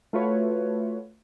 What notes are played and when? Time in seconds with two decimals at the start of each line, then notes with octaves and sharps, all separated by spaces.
0.13 A3 F4 F#4 B4 C#5